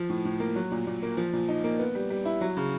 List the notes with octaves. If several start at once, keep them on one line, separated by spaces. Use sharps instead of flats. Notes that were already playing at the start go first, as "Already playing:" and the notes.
Already playing: F3
A2
A2
A#3
F#3
A#2
A#2
A#3
F3
A#2
D#4
A#3
B3
G3
G3
E4
F#3
C#3